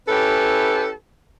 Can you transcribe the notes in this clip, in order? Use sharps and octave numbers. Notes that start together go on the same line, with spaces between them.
C#4 E4 G4 A4 B4